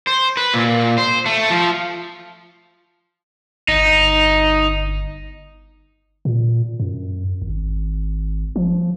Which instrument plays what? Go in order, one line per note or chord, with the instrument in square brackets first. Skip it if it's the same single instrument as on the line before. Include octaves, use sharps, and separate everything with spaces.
[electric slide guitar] C5
B4
A#2
C5
A3
F3
[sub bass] G1 [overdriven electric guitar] D#4
[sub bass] A#2
F#2
G#1
F3